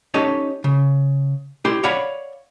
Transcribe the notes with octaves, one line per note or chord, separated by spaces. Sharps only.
C#4 D#4 G4 A4 C#5 D#5
C#3
E4 G4 C5 G5
C#5 D5 F5 F#5 B5